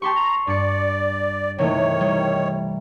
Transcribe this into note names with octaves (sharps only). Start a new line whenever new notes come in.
G4 A5 C6 C#6
A#5
G2 D5 C#7
C3 D#3 E3 A3 C#5
G3